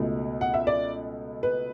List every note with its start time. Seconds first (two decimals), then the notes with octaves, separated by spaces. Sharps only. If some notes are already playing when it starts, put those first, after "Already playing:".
Already playing: C#2 B2 A3
0.41 F#5
0.54 E5
0.67 D5
1.43 B4